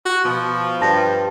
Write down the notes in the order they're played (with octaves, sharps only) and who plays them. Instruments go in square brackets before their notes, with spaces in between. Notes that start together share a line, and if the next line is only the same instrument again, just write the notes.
[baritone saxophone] F#4
[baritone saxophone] B2 [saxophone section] F3
[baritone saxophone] G2 [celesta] A5 A#6